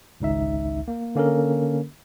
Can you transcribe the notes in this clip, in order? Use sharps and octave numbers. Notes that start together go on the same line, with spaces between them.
G#1 C#2 D#4 E5
A#3
D3 A#3 C#4 A4 A#4